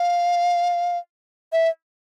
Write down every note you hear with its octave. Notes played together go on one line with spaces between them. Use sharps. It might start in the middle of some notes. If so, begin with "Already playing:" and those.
Already playing: F5
E5